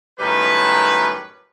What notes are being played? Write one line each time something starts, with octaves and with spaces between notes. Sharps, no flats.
F#2 A2 D#3 G3 B4